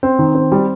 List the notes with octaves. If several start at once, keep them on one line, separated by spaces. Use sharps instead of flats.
C4
D#3
C4
G3